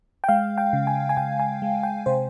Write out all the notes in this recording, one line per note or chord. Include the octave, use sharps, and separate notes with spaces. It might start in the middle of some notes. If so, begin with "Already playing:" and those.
G5
G#3 F5
G5
C#3
G#5
G#5
C#3 G5
G#5
G#3
G5
C3 C5